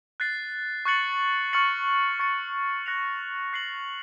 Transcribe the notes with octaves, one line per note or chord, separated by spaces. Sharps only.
F#6 A6 C7
C#6 F#6 A6 C#7 F#7
C#6 F6 A6 C#7 F#7
C#6 A6 C#7
F#6 A#6 C#7 F7
F#6 C7 F#7